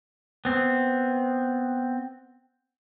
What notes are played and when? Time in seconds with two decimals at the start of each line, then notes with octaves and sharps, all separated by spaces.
0.45 B3 C4